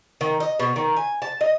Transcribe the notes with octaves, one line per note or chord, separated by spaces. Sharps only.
D#3
D#5
B2
D#3
G#5
A5
D#5